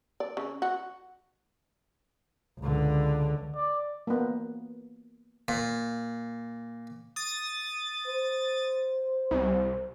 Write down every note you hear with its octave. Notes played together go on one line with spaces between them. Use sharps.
D5
C#3
F#4
C#2 D3
D5
A#3 B3
A#2
D#6 A6
C5
C2